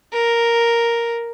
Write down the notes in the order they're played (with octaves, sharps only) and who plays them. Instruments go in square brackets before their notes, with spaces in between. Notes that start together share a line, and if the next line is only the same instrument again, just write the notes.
[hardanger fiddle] A#4